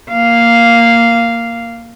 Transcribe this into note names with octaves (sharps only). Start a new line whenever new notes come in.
A#3 F5